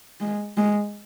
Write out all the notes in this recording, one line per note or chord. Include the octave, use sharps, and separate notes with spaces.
G#3
G#3